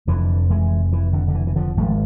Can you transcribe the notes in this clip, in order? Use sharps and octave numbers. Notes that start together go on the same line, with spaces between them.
F1 F2 D3 E3
E3 G#3
E3
D3
D3
E3
E3
D3 F3
G#1 G#2 F3 A3